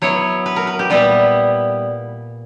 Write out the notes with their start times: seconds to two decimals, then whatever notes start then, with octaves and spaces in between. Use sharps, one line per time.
0.02 F#3 B3 E4 C#5
0.46 B4
0.56 A#4
0.67 B4
0.79 G4
0.90 A#2 G3 B3 E4 B4